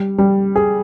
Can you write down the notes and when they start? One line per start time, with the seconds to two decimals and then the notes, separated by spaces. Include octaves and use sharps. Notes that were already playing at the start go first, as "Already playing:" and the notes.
Already playing: G3
0.18 G3
0.56 G#4